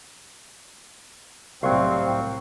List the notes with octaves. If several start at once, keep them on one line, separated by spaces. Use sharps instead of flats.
C2 A2 F#3 C4 F5 C6 C#6